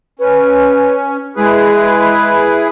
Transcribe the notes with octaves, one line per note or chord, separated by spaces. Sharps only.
C#4 B4
G#3 E4 G#4 B4